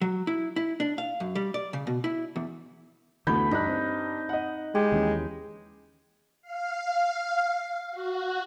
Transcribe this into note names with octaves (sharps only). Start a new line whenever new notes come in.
F#3
E4
E4
D4
F5
F#2
G3
D5
C#3
B2
E4
E2
D2 E3 A3 B3 B5 G6
G2 D#4 F#6
C4
D#5 F#5
G#3 G4
D#2 E3 C#4
F5
F#4